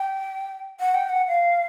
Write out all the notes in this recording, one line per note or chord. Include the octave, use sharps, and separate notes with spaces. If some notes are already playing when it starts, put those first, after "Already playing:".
Already playing: G5
F#5
G5
F#5
F5